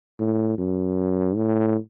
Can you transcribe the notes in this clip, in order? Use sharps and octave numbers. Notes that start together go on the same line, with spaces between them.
A2
F#2
A2